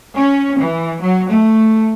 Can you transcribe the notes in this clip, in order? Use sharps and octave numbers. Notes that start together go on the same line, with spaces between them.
C#4
E3
F#3
A3